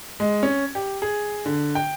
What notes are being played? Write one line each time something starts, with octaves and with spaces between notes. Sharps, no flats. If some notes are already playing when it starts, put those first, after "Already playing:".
G#3
C#4
G4
G#4
D3
G5